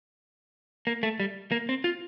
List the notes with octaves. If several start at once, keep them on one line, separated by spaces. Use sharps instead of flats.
A#3
A3
G3
A#3
C4
F4